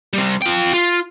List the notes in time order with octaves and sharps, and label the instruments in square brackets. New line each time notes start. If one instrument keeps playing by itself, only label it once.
[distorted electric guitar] G3 C4
F4 G5
F4